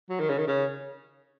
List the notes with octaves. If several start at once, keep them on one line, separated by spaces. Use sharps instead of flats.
F#3
D#3
C#3
D#3
C#3